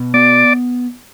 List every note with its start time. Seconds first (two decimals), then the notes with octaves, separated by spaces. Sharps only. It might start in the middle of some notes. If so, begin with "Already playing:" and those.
Already playing: B2
0.14 B3 D5